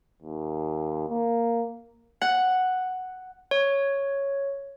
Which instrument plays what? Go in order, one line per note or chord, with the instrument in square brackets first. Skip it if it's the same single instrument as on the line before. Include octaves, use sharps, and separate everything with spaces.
[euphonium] D#2
A#3
[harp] F#5
[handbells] C#5